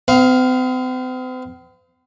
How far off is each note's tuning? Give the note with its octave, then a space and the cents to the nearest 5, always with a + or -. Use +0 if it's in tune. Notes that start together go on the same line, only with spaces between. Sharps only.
C4 -45 F5 +5